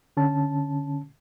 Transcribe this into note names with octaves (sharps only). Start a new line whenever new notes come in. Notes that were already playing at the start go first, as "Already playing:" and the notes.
D3 C#4 A5